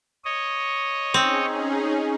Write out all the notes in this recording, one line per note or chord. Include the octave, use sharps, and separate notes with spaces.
C#5 D#5
C4 C#4 D#4 G#4